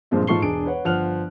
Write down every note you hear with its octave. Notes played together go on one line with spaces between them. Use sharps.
G2 A#2 F3 G#3 C4
G#2 F4 A4 C#6 C7 G7
E1 D4 G#4 D7
B4 C#5 F#5
G1 F3 F#5 F6 F#6 F7